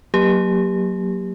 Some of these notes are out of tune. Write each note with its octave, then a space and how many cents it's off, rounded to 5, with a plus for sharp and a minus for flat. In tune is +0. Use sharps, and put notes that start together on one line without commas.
F#3 +0 A#3 +5 G4 +15